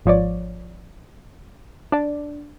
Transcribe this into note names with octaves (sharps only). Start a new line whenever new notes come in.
G#1 F3 C#5 D5
D4 D5